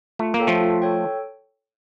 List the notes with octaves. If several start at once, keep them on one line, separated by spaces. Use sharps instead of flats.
A3 F4
A#3
A4 C#5 G5
F3 A3
F4
A4 C#5 G5